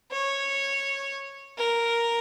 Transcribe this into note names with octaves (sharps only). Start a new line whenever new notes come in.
C#5
A#4